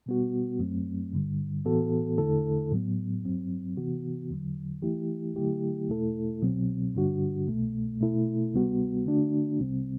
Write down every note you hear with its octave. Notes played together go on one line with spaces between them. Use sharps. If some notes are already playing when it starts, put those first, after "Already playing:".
B2 G3 B3 F#4
F#2 F#3 A3 C4
G2 D3 G3
A2 E3 B3 F#4 A4
E2 D3 A3 E4 A4
A2 F#3 B3
G2 F#3 C4
C3 E3 B3 F#4
E2 D3 F#3
E3 A3 E4 G4
D3 F#3 A3 E4 G4
E2 B2 A3 E4 A4
C2 B2 F#3 C4
G2 D3 G3 D4 F#4
C2 B2 A3
B2 A3 E4 A4
D2 C3 G3 B3 F#4
D3 A3 D4 F#4
C2 C3 G3 C4